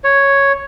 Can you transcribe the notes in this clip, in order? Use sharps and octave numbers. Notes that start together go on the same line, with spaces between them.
C#5